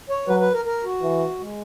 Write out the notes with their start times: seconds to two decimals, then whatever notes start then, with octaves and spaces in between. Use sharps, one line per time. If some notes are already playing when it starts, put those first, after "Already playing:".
0.09 C#5
0.27 F#3 B4
0.40 B4
0.53 A#4
0.65 A#4
0.84 F#4
1.02 E3
1.39 G#3